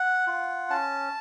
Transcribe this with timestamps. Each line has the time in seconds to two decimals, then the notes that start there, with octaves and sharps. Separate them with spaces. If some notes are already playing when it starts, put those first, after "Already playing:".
Already playing: F#5
0.27 F4
0.70 C#4 A5